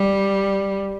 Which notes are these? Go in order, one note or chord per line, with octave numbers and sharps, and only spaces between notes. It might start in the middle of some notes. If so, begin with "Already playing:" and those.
Already playing: G3